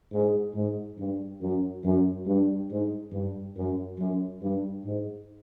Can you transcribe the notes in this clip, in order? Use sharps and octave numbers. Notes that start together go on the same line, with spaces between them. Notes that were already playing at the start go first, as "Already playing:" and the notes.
G#2
G#2
G2
F#2
F#2
G2
G#2
G2
F#2
F#2
G2
G#2